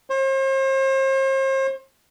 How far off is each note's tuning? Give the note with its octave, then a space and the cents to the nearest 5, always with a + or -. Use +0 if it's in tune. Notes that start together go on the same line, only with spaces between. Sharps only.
C5 +40